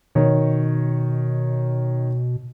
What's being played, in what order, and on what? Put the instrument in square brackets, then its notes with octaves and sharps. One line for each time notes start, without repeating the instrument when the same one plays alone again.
[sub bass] B2 [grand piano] D#3 C#5